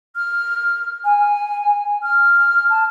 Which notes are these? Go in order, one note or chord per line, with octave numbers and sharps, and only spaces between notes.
F6
G#5
F6
A5